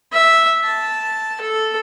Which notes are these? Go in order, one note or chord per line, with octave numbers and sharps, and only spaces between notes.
E5
A5
A4